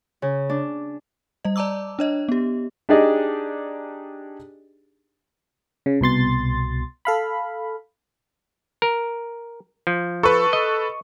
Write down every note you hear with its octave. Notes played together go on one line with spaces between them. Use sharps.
C#3
D4
G3 D#5
D5 A5 A#5 D6 E6
D4 C#5 D#5
B3 G4
D4 D#4 G4 G#4 D5 D#5
C#3
C2 B2 C6 A6
A4 F5 B5
A#4
F3
A4 B4 C#6
D#5